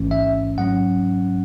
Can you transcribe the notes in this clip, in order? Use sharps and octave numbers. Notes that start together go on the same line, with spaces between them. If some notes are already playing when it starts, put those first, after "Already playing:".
Already playing: A1 G#2 E3 A3 C#4
E5
G#2 F#3 C#4 F#5